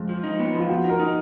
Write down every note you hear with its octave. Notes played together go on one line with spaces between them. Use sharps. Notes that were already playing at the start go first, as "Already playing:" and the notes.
Already playing: F2 G#3
F3
D#4
B3
F3 F4
F3 F#4
D#4
A#4
D#4